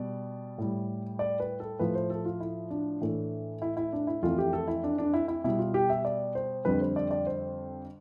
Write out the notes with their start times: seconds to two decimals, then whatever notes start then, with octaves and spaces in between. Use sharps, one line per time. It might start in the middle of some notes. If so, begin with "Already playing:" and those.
Already playing: B2 G3 D5
0.58 A2 G3
1.19 D5
1.40 B4
1.60 A4
1.79 A2 F3 A3 B4
1.95 C5
2.10 A4
2.25 F4
2.40 E4
2.70 D4
3.01 A2 E3 A3
3.62 E4
3.77 E4
3.93 D4
4.07 E4
4.22 F2 E3 A3 F4
4.38 G4
4.53 A4
4.68 E4
4.84 D4
4.98 D4
5.14 E4
5.28 E4
5.44 B2 G3 E4
5.59 F4
5.74 G4
5.90 E5
6.05 D5
6.35 C5
6.65 F2 D3 G3 B4
6.81 C5
6.96 D5
7.11 D5
7.27 C5